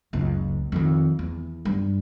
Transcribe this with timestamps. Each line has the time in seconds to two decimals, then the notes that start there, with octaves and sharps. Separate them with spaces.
0.13 F#1 C#2
0.72 F2 D#3
1.19 E2
1.65 G2